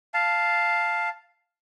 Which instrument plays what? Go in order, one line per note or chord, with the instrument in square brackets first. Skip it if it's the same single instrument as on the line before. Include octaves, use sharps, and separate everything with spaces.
[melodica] F5 A5